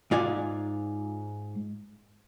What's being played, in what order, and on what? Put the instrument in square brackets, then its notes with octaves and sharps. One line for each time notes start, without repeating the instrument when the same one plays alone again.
[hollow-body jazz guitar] G#2 F4 D5 G#5